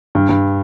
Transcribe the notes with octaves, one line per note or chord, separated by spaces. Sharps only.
G2
G2